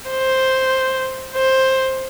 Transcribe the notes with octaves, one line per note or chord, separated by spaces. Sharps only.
C5
C5